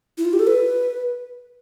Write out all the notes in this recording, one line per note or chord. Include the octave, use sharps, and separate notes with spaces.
E4
F4
G4
A4
B4